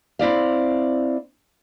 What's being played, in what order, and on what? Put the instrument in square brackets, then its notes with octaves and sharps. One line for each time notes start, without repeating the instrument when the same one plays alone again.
[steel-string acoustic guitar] C4 E4 D5 F5